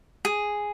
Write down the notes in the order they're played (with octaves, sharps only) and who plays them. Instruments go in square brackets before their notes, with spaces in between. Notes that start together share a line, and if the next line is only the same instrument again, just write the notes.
[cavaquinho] G#4